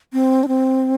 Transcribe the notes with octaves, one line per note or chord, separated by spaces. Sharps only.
C4
D4
C4